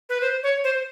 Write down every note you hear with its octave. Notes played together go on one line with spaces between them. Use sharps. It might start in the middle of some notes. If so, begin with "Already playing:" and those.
B4
C5
C#5
C5